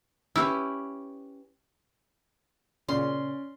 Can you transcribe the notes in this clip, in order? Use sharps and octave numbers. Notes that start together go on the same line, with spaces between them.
C#4 E4 G4 B4
A#2 C#3 C#4 D5 C6